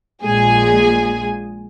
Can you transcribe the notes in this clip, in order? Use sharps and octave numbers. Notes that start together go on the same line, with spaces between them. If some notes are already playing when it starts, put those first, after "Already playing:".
A#1 A#2 G#3 G#4 G#5